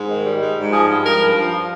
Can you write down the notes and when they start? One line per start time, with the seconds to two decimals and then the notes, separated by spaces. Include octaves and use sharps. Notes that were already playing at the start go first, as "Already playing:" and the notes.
Already playing: G#2
0.08 D#3
0.24 G3
0.40 G#2
0.57 G#2
0.72 F3 G#4
0.89 G2
1.04 F3 A#4
1.20 G2
1.35 F3